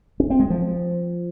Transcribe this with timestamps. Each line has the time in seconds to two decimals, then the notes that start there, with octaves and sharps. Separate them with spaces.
0.20 C#4
0.30 C4
0.40 G#3
0.50 F3